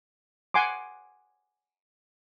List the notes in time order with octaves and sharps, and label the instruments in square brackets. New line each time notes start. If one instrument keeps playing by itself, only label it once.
[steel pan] F#5 G#5 C6 D6